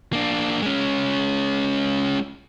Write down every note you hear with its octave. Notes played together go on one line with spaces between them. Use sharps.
A#3 D4
G#3 C#4